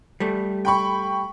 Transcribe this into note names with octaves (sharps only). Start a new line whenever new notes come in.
G3 A3
G5 B5 C#6